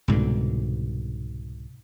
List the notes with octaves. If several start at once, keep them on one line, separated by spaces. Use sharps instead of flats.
C2 G#2 B2 D3